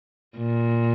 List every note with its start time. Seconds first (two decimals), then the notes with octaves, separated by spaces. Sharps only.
0.37 A#2